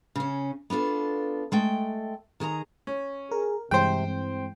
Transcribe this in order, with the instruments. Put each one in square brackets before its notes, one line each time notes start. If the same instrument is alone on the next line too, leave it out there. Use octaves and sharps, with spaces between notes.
[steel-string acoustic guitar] C#3 C#4
B3 D4 F4 A4
G#3 A3 G5
D#3 G#4 A5 A#5
[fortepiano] C#4
[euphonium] G#4 [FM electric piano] A#4
[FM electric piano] G2 E3 G#3 [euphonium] C3 [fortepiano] C5 G5
[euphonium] C4